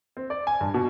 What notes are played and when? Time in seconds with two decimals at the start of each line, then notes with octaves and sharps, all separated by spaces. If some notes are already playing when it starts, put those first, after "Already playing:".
0.17 C4
0.30 D5
0.47 G#5
0.61 G2
0.74 B2